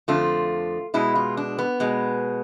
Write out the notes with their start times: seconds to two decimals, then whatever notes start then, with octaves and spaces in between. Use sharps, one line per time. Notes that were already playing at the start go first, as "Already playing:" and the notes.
0.08 F2 D3 A3 F4
0.94 B2 G#3 E4
1.15 F4
1.37 D4
1.58 B3
1.80 B2 G#3